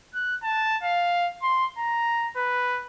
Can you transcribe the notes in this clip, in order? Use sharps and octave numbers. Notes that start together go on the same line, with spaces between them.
F#6
A5
F5
C6
A#5
B4